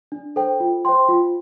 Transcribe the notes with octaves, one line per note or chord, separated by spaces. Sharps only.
D4
A4 C5 G5
F4
C5 G5 C6
F4